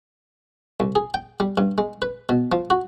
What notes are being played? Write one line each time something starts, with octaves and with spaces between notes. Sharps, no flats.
C2
G#4
G5
G3
G2
G#3
B4
B2
F3
F#4